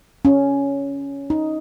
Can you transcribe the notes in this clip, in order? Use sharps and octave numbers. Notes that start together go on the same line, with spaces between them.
C#4
D#4